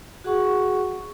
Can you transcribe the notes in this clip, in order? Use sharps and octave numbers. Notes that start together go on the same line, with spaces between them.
F#4 G#4 F#5 C#6